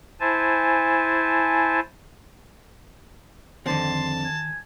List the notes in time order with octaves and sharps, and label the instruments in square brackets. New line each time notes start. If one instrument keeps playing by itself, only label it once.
[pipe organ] E4 C5 G#5 A5
[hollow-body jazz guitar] F2 D3 C4 [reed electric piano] D#3 [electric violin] A5 [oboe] C6
[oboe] G#5